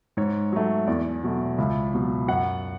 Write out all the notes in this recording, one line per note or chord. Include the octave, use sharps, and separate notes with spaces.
G#2 C#5
F#3 A3
E2 D5
B2 F#3 A3
C#2 E5
B2 F#3
F#2 F#5